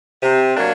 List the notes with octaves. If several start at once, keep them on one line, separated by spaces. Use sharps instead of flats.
C3
F#3 A#3 D4